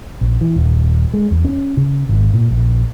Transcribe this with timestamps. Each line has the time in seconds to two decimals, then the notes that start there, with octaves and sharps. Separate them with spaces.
0.21 A#1
0.41 E3
0.56 D#1
1.14 G#3
1.31 E2
1.45 C#4
1.77 C#3
2.09 G#1
2.34 A#2
2.51 A#1